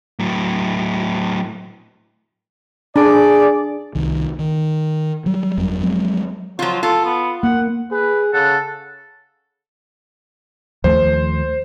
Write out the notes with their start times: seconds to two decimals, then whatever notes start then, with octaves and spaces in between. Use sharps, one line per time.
0.19 A2 F#3
2.96 D4 G#4 D5
3.95 C2 D#3
4.39 D#3
5.26 F#3 G3
5.57 G1 F2 F#3 G3
5.82 F3 F#3 G#3 C4
6.59 F3 F#3 F4
6.83 F4 A4
7.05 B3
7.43 A#3 F#5
7.92 G#4 B4
8.33 C#3 A4 F#5
10.84 D#2 F3 A3 C5